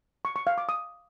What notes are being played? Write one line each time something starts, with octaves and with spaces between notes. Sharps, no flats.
C#6
C#6
F5
D6
D#6